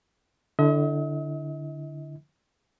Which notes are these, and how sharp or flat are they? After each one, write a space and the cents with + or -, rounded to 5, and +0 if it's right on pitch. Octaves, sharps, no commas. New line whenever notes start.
D3 +0 E4 +0 D#5 +45